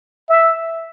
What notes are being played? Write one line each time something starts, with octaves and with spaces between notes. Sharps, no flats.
E5